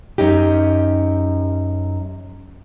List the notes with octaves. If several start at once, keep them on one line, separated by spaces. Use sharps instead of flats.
F#2 C#4 D#4 G4